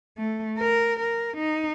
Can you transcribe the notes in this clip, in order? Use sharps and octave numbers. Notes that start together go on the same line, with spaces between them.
A3
A#4
A#4
D#4